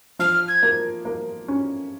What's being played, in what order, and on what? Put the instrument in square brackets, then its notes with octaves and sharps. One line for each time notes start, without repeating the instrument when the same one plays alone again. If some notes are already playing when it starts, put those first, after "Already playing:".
[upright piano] F3 [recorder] F6
[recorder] G#6
[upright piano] A#3
A#3
C#4